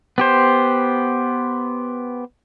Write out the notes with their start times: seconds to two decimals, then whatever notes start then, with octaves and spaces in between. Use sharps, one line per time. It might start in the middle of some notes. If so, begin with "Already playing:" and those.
0.18 B3 G4 C5